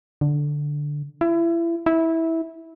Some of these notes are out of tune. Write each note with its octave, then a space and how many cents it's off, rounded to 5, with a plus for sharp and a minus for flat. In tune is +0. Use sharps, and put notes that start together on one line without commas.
D3 +0
E4 +30
E4 -15